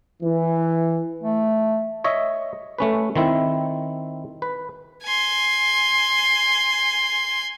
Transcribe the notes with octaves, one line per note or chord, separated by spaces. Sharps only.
E3
A3
C#5 D#5 E5
A3 C#4 B4
D#3 C4 E4
B4
G#5 C6